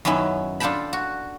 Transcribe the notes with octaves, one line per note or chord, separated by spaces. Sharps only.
F#2 D#3 B3 C#4 E4
D4 F4 A4 G5 A5 B5
F#4